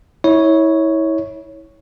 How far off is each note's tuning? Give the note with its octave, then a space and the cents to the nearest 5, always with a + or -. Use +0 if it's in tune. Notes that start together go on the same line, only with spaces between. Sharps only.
E4 -30 C#5 +0